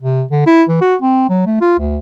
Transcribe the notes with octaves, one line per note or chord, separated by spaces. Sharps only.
C3
D3
E4
E3
F#4
C4
F#3
A3
F4
D2